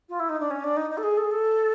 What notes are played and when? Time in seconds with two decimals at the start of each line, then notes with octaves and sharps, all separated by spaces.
0.09 F4
0.19 E4
0.29 D#4
0.40 D4
0.50 C#4
0.64 D4
0.76 D#4
0.90 D#4
0.97 A4
1.03 G#4
1.17 A4
1.24 G#4
1.31 A4